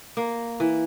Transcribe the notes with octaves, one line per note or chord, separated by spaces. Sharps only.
A#3
E3